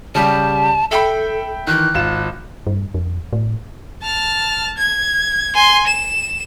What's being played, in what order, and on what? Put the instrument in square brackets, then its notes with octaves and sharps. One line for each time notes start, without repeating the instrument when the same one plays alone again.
[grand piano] C#3 G3 G4 [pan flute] A5
[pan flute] A4 [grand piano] E5 G5 B5
[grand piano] D#3 E3 [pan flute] F#6
[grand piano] G#1 F4 E7
[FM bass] G2
F2
A2
[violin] A5 F6
G#6
G#5 C6
E7